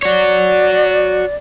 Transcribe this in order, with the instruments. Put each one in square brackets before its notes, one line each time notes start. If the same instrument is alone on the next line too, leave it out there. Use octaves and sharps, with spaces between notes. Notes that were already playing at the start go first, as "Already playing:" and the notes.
[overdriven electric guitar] F#4 C#5 [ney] D5